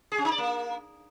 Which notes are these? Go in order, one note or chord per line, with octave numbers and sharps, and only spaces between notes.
G#4
C#4
D#4
D5
A#3